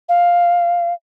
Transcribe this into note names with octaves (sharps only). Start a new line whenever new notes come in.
F5